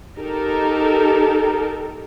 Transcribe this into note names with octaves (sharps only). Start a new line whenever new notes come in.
D#4 G4 A4 A#4